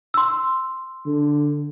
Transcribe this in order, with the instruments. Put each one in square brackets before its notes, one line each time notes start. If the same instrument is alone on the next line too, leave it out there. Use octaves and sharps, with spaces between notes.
[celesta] C6 E6
[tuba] D3